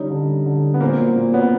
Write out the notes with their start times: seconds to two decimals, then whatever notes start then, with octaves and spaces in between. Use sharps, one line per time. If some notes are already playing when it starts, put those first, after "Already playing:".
Already playing: D3 G3 C#4 D#4
0.10 D3
0.28 G3
0.46 D3
0.63 G3
0.74 B3
0.81 A#2 A#3 C4
0.99 F#3
1.16 A#2
1.34 F#3 B3 C#4